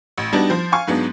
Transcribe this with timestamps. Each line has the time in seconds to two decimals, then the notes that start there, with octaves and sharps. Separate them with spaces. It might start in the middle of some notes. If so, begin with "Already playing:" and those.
0.18 A1
0.33 G3 B3 D4 D#4 F#4
0.50 F3 C5
0.72 F5 G#5 C#6
0.87 G#2 F#3 G#3 B3 D4